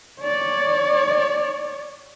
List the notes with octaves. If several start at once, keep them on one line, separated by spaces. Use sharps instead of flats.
C#5 D5